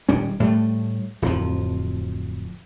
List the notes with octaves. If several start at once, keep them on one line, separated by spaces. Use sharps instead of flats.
D#1 G3 C#4
A2 G3 A3
D1 F2 F3